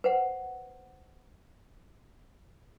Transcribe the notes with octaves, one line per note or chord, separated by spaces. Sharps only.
B4 C5 F#5